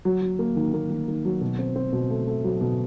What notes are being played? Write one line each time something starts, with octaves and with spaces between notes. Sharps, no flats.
F#3
F#3
A#3
D#3
A#3
D#3
D#3
F#3
B2
C4
C4
B2
A3
A3
F#3
B2